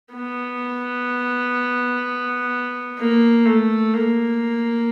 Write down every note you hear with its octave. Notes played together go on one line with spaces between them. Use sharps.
B3
A#3
A3
A#3